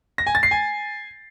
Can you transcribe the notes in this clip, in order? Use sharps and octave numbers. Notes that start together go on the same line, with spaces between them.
A#6
G#5
A6
C7
G#5